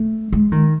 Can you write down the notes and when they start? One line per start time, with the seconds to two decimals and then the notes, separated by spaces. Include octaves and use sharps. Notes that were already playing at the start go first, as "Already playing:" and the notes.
Already playing: A3
0.32 G#3
0.52 D#3